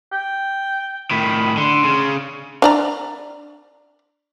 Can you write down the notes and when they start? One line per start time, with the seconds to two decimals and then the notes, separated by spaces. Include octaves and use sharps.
0.12 G5
1.11 A2 D#3 B5
1.57 D3 C6
1.84 C#3
2.62 D4 D5 A#5